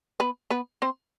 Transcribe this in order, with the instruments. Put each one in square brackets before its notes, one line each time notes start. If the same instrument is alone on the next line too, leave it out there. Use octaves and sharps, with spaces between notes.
[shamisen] B3 B4
B3 B4
C4 C5